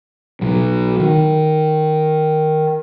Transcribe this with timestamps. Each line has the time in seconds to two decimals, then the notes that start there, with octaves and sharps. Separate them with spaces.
0.41 B1 B2 F#3
0.99 D#3